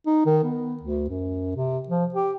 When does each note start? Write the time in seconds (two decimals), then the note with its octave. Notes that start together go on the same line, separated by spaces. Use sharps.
0.06 D#4
0.26 D#3
0.44 B3
0.82 D2
1.10 F#2
1.56 C3
1.88 F3
2.14 G4